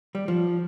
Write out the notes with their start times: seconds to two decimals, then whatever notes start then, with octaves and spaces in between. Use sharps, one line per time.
0.15 G3
0.28 F3